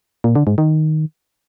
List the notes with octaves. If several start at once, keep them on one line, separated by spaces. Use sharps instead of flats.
A#2
D3
G#2
D#3